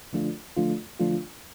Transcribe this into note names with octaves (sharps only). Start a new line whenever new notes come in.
D3 F3 A3 D4 F4
D3 F3 A3 D4 F4
D3 F3 A3 D4 F4